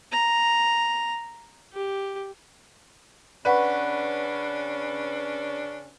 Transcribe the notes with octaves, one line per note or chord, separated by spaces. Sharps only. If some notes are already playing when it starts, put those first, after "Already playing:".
A#5
G4
C#3 C#4 D4 B4 D5 F#5 C#6